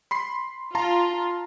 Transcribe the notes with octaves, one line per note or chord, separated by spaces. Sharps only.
B5 C6 C7
F4 A5 A#5 C6